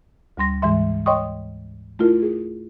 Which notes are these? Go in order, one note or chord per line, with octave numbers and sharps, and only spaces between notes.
D2 G3 C6 A#6
G#2 E3 G#3 E5 C6
C#5 D#5 G5 C6 C#6 D#6
A3 E4 F4 A#4
G#4